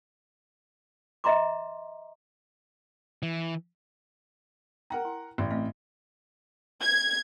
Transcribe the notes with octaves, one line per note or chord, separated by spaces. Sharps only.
D#5 E5 A#5 C6 D6
E3
A#4 F#5 G5 A#5
E4
A1 D5
A3 C4 D#5
G#6